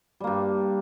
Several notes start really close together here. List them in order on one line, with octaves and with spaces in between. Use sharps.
G3 A#3 G2